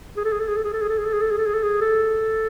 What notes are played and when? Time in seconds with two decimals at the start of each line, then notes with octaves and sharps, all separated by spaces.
0.17 G#4
0.24 A4
0.33 G#4
0.40 A4
0.48 G#4
0.57 A4
0.65 G#4
0.73 A4
0.82 G#4
0.89 A4
0.98 G#4
1.06 A4
1.13 G#4
1.22 A4
1.31 G#4
1.38 A4
1.46 G#4
1.54 A4
1.63 G#4
1.81 A4